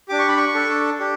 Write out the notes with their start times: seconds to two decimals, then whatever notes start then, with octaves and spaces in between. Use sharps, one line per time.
0.09 D4 G4 D6
0.19 C#6
0.28 B5
0.37 C#6
0.54 D4 A4
0.99 D4 G4